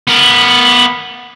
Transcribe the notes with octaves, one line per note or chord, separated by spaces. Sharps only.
B3 A#4